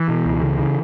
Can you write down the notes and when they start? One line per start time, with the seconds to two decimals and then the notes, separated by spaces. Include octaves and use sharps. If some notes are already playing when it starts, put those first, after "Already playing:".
Already playing: E3
0.09 B2
0.26 C#2
0.43 C#3
0.59 C#3